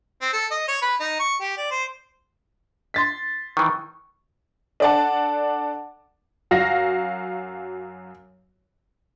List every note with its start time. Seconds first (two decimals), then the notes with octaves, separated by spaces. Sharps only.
0.22 C4
0.33 A4
0.51 D#5
0.68 C#5
0.82 B4
1.00 D#4
1.20 C#6
1.41 G4
1.57 D5
1.71 C5
2.94 C6 A6 B6
3.57 D#3 E3 C#6
4.80 D4 A4 D5 F#5 A5
6.51 F#2 F#4 F5 A#6